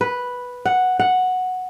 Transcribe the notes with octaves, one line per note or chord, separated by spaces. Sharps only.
B4
F#5
F#5